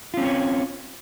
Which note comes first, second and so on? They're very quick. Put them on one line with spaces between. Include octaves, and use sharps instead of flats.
F4 C#4 C4 C#5